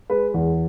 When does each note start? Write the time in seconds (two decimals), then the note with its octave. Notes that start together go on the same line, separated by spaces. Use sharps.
0.10 G#3 B4
0.34 E2